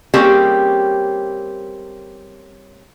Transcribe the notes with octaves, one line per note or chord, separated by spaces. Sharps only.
G3 A#3 C4 C#4 G4 G#4